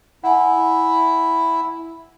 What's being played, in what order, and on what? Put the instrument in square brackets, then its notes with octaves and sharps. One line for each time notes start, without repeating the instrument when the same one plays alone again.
[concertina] E4 [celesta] F#5 G#5